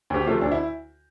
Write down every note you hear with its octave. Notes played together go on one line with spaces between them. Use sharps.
D2 G4
C3 F3 A3 C4 F4
D2 D4
E4